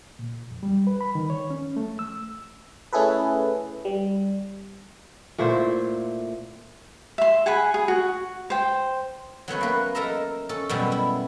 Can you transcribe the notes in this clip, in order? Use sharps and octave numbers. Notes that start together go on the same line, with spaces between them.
A#2
F2
G3
B4
B5
D#3
C#5
C#4
A3
E6
A3 C#4 E4 G#4 A4 B4
G3
A#2 A3 E4 C5
E5 C6
G#4 F#5 G#5 B5
G#4
F#4
C5 G5
F#3 A3 B3 C#4
A#3 B4
A4 A#4 D#5 E5 A#5
C#4 A4
F#2 B2 G3
E4